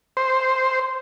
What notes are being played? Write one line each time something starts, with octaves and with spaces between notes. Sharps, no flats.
C5